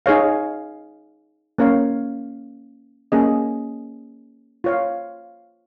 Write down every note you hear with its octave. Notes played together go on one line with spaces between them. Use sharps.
D#4 G#4 C#5 F5
A#3 C#4 A#4 C#5 F5
A#3 C#4 G#4 D#5
F4 C#5 F5